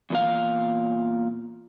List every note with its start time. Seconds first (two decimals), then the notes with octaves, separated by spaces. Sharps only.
0.10 E2 A#2 F5